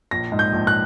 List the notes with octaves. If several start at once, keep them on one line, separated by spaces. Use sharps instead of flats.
A#1 A#6
G#2
G6
A#1
F#6